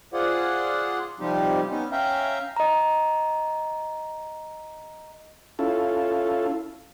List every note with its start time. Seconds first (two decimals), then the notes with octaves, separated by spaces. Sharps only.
0.13 F4 G#4 C5 D5 F#5
1.20 C3 F3 G3 C4 D#4 G4
1.70 B3 C#4 D#4
1.92 C#4 E5 F5 G5 A#5
2.57 D#5 A#5
5.59 C#4 E4 F4 A4